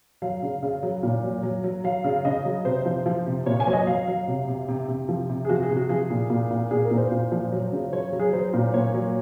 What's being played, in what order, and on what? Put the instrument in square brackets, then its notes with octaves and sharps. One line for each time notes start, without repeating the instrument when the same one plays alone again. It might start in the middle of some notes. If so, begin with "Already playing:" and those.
[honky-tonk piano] F#3 F5
C#3
C#3
F#3
A#2
F#3
F#3
F#3
F#3 F5
C#3
C#3 D#5
F#3
C3 C5
F3
F3
C3
A#2 C#5
G#5
F#3 C#5
D#5
F#3 F5
F#3
C3
C3
C3
C3
F3
C3
G#4
F3 F#4
G#4
C3
F#4
F3 G#4
A#2
A#2
A#2
A#2 G#4
A#4
A#2
C5
A#2
F3
F#3
C#3
F#3 C#5
F#3
G#4
F#3 C5
A#2
A#2 C#5
F#3